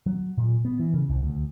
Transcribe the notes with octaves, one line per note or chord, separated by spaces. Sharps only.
F#3
A#2
B3
E3
C#3
C2
D2